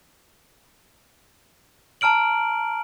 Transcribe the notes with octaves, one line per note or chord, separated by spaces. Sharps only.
A5 A#5 F6 D7 F#7